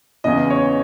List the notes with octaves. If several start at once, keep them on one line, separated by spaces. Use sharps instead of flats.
E2 C#3 E3 D#5
C#5